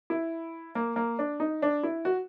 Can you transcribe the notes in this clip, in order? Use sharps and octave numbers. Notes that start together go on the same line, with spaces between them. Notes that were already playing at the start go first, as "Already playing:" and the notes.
E4
A#3
A#3
D4
D#4
D4
E4
F#4